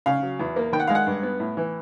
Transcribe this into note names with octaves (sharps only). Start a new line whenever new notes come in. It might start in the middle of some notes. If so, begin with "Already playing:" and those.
C#3 F5
F#3
E2
A#3
D#3 G5
F#5
G#3 F5
F#5
G2
B3
A2
E3